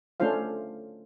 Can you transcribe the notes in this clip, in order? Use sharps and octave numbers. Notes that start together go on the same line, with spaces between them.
A3 C#4 D4 F4 C5 F5